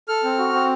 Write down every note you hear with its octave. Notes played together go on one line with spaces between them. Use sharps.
A4 F6
C4
F#4
C4